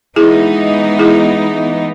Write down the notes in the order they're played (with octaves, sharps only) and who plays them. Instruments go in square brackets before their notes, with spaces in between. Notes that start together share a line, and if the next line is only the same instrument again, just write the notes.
[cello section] E3 G#3 B3 D#4 [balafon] E4 G#4
[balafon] E4 G#4